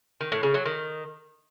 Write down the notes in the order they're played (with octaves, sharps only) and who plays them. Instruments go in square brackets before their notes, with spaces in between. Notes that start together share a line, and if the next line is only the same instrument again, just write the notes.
[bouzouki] D#3
A2
C#3
F#3
D#3